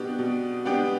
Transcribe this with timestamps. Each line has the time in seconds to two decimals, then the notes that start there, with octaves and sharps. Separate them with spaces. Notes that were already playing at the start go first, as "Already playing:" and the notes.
Already playing: B2 B3 D4 G4
0.19 B2
0.65 B3 D4 G4